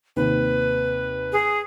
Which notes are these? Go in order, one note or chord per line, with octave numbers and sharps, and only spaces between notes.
D#2 C3 B4
G#4